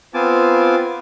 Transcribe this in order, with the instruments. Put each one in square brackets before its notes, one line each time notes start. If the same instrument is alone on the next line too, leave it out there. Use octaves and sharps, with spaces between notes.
[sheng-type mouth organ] B3 C4 F4 G#5 A5 D6